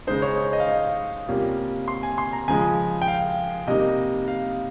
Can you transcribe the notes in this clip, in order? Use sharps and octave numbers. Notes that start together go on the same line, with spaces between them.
C#3 G#3 D#4 C5
C#5
C#5
D#5
F5
D#5
C3 G3 A#3 C#4 F4
C6
G#5
C6
A#5
C#3 F3 G#3 G#5
G5
F5
C3 G3 A#3 D#4 D#5
F5